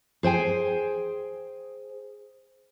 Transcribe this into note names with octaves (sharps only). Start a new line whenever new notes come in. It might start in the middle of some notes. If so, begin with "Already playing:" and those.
G#4 C5 G5 G#5